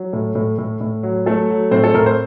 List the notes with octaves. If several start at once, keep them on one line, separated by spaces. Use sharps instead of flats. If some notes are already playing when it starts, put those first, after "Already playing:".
Already playing: F#3
A2
A2
A2
A2
F#3
F#3 A3 A4
F#3
A2 C4 C5
A4
A2 A#4
C5